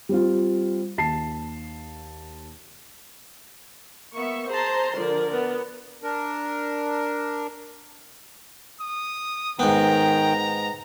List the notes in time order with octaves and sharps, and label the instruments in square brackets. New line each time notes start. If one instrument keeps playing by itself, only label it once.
[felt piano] G3 C4 F4
D#2 A5 C7
[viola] A#3 B3 [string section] E5 C#6
[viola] G#4 A5 [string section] C5 A#5 C6
[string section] D3 F3 [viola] A#4 D5
[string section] B3
[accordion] D4 A#4
[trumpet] D#6
[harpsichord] G#2 B3 [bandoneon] D#3 G5 [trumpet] A#5